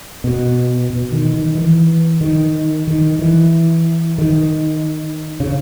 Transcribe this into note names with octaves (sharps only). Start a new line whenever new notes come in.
B2
B2
D#3
D#3
E3
D#3
D#3
E3
D#3
C#3